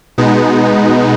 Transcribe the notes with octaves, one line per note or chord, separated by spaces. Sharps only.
B2 G#3 B3 D#4